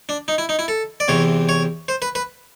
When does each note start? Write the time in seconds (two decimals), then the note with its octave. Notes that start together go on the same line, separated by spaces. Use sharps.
0.09 D4
0.28 D#4
0.38 E4
0.49 D#4
0.59 E4
0.68 A4
1.00 D5
1.08 E2 C3 E3 C#5
1.49 C#5
1.88 C5
2.02 B4
2.15 B4